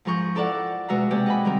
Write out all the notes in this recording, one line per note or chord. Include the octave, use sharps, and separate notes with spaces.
G#2 F3 G#4 A#4 C#6 G6
E4 A4 A#4 D5 F5 F#5
B2 G#3 F#4 E5 F5 A#5
C3 G#3 A#3 G4 D5
D#5 F#5 G#5 B5
D#3 G3 C4 A#4